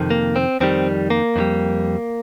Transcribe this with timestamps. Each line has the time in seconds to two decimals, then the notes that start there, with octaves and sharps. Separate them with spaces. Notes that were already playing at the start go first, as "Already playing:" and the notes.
Already playing: F2 C3 D#3
0.10 A#3
0.36 C4
0.60 F2 D#3 G3 C4
1.10 A#3
1.36 F2 D#3 G3